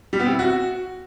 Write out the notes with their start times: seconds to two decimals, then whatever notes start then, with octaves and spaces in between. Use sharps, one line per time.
0.13 G3
0.19 B3
0.26 C4
0.32 E4
0.39 F#4